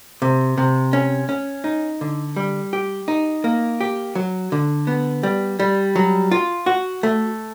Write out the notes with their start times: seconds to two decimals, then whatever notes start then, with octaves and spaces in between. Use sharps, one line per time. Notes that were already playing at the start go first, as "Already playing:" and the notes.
0.22 C3
0.58 C3
0.93 C#4
1.29 C#4
1.64 D#4
2.01 D3
2.36 G3
2.73 G4
3.08 D#4
3.44 A#3
3.81 G4
4.15 F#3
4.52 D3
4.87 B3
5.23 G3
5.59 G3
5.96 F#3
6.31 F4
6.66 F#4
7.03 A3